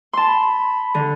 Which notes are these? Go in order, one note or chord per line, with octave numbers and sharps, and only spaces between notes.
A5 C6
B5
D3